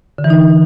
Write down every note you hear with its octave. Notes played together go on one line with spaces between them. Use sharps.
D3
E3
D#4